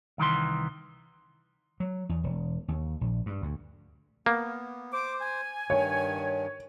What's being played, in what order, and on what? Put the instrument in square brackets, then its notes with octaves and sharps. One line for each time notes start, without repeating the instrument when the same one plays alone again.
[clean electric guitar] C2 D#3 E3 C6
[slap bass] F#3
E2
E1
D#2
A#1
G2
D2
[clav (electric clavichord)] A#3 [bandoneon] B3
[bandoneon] C5 [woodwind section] D6
[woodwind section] G#5
[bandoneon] G2 D#3 [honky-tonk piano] C#5